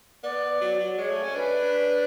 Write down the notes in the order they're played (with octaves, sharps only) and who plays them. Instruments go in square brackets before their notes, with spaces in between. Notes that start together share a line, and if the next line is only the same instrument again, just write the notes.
[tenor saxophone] B3 [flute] D5
[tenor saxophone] F#3
F#3
[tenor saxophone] G#3 [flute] C#5
[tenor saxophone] A3
C#4
[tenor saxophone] D4 [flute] B4